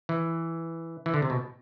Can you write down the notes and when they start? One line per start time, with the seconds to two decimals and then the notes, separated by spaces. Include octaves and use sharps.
0.09 E3
1.06 E3
1.14 D3
1.22 C3
1.30 B2